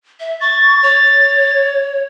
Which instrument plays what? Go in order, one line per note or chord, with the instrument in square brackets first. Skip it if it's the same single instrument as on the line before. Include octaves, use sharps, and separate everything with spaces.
[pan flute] E5
[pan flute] C#6 [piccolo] A6
[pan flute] C#5